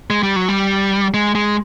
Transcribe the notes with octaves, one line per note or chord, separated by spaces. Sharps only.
G#3
G3
F#3
G3
G#3
G#3